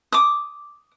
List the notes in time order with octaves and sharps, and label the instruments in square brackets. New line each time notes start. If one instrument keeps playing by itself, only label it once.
[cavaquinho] D6 D#6